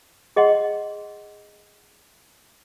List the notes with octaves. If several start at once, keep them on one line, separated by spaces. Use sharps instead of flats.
G#4 D#5 F#5 C6